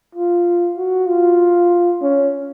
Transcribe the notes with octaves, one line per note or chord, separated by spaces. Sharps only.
F4
F#4
F4
C#4